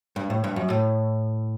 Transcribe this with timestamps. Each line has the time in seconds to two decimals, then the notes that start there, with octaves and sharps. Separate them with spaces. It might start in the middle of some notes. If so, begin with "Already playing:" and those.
0.16 G2
0.30 A2
0.44 G2
0.56 F#2
0.70 A2